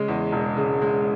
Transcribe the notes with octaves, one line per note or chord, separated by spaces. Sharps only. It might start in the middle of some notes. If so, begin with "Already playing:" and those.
Already playing: C#3 G#3
E2
E1
C#3
G#3